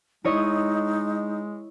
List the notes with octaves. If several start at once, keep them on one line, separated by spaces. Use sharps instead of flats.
G#3 D#4 E4 C#5 D#5